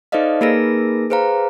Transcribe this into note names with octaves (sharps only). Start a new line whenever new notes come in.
D#4 A4 C5 D5 D#5 F5
A#3 D#4 G#4 A#4 B4 A#6
G#4 B4 C5 F5 A#5